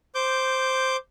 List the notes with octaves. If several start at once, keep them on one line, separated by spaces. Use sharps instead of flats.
C5 D6 G6